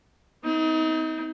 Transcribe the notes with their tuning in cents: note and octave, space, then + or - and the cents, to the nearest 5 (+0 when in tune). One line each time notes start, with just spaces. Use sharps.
C4 -30 D#4 +30